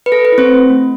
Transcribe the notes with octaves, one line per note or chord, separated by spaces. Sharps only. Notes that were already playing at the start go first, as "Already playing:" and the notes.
B4
A4
B4
E4
C4 C5
A3
A3